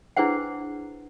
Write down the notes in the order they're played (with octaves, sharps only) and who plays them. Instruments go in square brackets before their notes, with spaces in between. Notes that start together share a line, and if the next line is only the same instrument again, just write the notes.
[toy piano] D4 E4 G#4 B4 C5 F#5